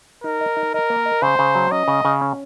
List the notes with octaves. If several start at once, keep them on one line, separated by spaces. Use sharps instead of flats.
D#4 A#4
D#5
D#4
A#4 D#5
A#3
D#5
C#3 C5
C#3
F#3
C#4 D#5
C#3
C#3
C#4